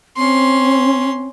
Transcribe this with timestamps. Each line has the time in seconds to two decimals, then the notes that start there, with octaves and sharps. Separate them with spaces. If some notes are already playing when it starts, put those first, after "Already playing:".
0.17 C4 C#4 C6